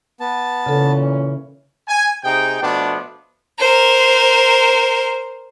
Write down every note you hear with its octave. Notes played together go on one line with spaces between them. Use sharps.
B3 A5
A#2 C#3 E3 C#4 A4
G#5
C3 D#4 G#4 G5
B2 F3 A3 B3 D4
A#4 C5